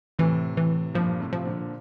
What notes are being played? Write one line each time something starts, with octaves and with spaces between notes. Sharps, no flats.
A2 C3 E3
E3
G2 A#2 F3
A2 C3
F3
A#2 D3